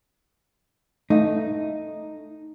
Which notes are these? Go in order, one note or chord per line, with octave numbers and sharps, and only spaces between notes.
A3 D#4